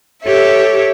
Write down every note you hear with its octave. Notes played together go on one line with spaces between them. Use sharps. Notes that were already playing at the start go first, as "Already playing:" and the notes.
G4 A4 C#5 E5